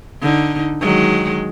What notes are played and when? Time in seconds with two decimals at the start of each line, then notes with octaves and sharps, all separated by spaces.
0.22 D3 D#4
0.80 D#3 F#3 G#3